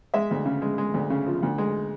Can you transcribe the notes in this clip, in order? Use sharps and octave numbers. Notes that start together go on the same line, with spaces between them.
G#3 E5
D2
C#3
G#3
G#3
D2
C#3
F3
D2
G#3